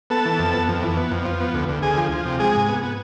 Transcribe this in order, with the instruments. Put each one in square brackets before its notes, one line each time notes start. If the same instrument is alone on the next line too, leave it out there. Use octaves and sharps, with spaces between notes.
[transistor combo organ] B3 A4 A5
E3
F2
B3
F2
E3
B3
F2
F3
B3
D2
D2
D2 G#4 G#5
F3
F3
C3
G#3 G#4 G#5
G#2
B3
B3